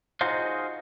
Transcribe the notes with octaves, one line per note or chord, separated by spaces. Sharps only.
D#4 F4 F#4 G#4 C5 D#5